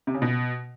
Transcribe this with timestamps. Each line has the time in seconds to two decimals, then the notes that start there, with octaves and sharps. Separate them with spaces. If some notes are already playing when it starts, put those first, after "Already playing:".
0.07 C3
0.14 C#3
0.22 B2